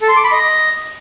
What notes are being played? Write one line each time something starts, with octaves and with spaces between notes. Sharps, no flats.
A4
C6
D6
B5
D#5